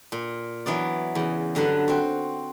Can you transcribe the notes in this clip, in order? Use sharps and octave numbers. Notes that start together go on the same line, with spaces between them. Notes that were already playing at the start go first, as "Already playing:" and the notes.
A#2
E3 F#3 B3 D5
E2 C#3
G2 D3 F#3 B4 F#5
C4 F#4